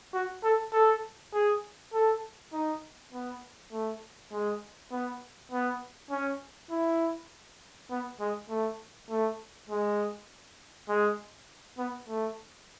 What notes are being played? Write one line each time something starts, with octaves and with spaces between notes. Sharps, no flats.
F#4
A4
A4
G#4
A4
D#4
B3
A3
G#3
B3
B3
C#4
E4
B3
G#3
A3
A3
G#3
G#3
B3
A3